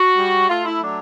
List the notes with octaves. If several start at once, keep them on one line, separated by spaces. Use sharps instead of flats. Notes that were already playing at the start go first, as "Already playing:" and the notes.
Already playing: F#4
G3
A3 F4
E4
F#3 D4